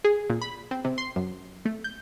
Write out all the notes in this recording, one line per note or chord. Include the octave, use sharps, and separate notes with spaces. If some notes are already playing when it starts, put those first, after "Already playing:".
G#4
A#2
B5
C4
C3
C6
F#2
A3
G6